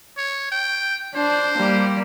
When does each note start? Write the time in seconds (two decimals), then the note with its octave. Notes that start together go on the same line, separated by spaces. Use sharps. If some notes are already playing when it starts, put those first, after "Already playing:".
0.17 C#5
0.52 G5
1.15 D4 C5
1.57 G3 A#3